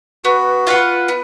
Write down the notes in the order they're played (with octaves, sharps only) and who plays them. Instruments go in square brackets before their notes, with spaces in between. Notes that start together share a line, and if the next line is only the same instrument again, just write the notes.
[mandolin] B3 [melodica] F#4
[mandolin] F4 B4 F#5
B3